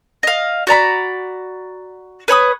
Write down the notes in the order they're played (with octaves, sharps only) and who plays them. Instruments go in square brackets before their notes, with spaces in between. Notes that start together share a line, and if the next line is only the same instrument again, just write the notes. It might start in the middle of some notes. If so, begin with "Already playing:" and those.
[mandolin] D#5 F5
F#4 D5 A#5 B5
B4 C#5 B5 D#6